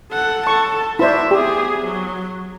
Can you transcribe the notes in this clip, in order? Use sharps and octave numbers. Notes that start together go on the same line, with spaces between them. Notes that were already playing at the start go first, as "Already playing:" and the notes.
A4 F#5
A4 A5 C#6
E4 F#4 C5 D5 E5
B3 G4 G#4
F#3